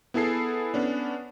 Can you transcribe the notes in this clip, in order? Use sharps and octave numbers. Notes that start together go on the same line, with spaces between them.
B3 E4 G#4 A4 C7
B3 C#4 D4